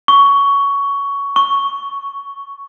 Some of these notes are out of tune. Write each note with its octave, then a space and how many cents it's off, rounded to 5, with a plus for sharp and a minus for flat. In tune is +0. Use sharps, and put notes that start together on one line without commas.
C#6 +15
C#6 +0